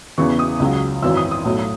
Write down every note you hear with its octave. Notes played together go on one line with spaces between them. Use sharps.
E2 C#3 E3 C#6
D#6
C#2 C#3 F#3
G#1 F#2 E3 E6
D#6
D#6
B1 A2 F#3